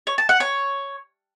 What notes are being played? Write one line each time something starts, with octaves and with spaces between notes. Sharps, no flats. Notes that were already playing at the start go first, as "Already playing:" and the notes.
C#5
A5
F#5
C#5